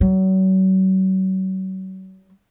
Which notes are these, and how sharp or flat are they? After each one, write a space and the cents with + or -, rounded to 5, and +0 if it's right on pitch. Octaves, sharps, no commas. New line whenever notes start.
F#3 +40